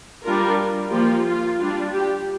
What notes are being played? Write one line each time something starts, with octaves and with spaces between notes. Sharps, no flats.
G3 D4 F4 A#4
F3 A#3 F4 G4
F4
G3 D4 F4
G4